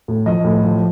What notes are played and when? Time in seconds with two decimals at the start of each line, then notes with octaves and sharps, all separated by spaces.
0.08 A2
0.26 F3 D#5
0.44 A2
0.64 F3